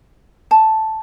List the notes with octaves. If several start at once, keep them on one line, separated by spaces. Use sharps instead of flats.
A5